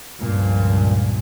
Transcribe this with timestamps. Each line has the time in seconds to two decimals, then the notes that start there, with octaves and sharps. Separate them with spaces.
0.20 C#2 G2 A#2 F3